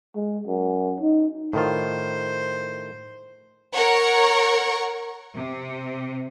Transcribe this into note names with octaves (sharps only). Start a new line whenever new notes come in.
G#3
F#2
D#4
A2 D#3 F4 C5
A#4 C#5 F#5 C#6
C3